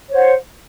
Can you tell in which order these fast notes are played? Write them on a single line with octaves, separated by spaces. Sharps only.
C#5 C5 F#5